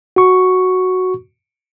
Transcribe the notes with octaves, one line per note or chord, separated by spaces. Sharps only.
F#4 C#6